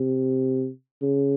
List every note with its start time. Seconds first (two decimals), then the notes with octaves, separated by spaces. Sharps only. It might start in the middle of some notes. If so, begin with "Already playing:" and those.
Already playing: C3
1.02 C#3